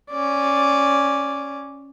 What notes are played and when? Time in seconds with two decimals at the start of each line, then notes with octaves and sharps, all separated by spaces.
0.11 C#4 D5